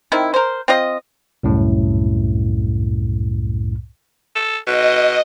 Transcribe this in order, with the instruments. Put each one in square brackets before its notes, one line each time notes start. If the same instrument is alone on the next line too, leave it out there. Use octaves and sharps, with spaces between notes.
[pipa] D#3 C4 E4
A#4 C5
C4 F4 D#5
[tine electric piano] C2 F#2 A2
[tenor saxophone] A4
[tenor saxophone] B2 [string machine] D#5